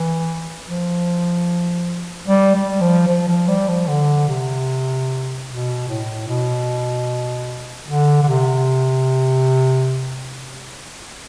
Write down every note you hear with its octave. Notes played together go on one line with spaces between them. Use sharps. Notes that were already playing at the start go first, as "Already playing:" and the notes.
Already playing: E3
F3
G3
G3
F3
F3
F3
G3
F3
D3
C3
B2
A2
B2
D3
D3
C3